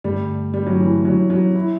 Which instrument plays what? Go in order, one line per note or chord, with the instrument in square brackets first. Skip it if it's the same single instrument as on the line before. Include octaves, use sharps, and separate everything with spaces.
[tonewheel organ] G2 D3 A3 [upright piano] G3
[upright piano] G3
F#3
E3
F#3
F#3
E4